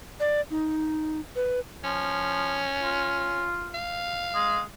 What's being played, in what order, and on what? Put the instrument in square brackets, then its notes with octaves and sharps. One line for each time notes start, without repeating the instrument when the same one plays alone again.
[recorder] D5
D#4
B4
[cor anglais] F3 [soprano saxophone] C#4
[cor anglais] F4
[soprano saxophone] F5
[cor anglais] G#3